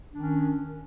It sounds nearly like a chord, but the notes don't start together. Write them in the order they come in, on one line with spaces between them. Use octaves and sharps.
D4 D#3 C#4